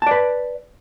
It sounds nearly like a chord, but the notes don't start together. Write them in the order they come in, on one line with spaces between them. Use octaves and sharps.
A5 D5 B4